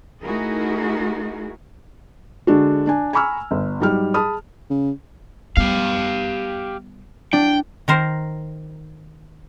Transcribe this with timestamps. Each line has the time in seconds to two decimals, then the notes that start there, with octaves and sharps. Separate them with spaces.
0.23 A3 D#4 E4 F#4 G#4 A#4
2.47 D3 G#3 D4 F#4
2.87 D4 G#5
3.13 G#5 A#5 B5 C#6 E6 F6
3.51 G1
3.80 G#2 F#3 G3 G4 F6
4.14 G#4 A5 B5 D#6 F6
4.70 C#3
5.57 G3 B3 G4 F5
7.33 D4 G5
7.88 D#3 A#4 C5